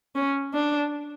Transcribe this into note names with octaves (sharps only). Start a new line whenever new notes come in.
C#4
D4